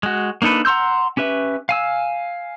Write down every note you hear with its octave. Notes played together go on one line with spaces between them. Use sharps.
G#3 F#4
A#3 D4 D#4 A4 B4
F#5 A#5 C6 E6 G6
C#4 G4 B4 E5
F5 G#5 E6